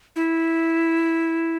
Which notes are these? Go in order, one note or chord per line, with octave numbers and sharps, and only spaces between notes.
E4